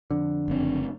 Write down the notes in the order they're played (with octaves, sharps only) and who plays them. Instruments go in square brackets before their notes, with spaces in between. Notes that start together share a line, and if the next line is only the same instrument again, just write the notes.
[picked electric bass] F2 D3
[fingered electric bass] F#1 C4